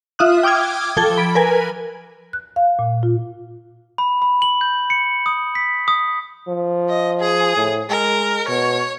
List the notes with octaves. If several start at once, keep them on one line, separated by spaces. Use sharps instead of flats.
F4 E5 D#6 F#6
G5 D6 D#6 F6 G#6
F3 A4 G#6 G7
B5 D7
A#4 B4 G#5
F#6
F5
A#2
F4
B5
B5
F#7
G6
C#7
D#6
B6
D#6
F3
D#5
G#4
A2
G#3 A#4
B2 C#5